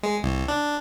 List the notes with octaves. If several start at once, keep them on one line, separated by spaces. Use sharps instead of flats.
G#3
C2
D4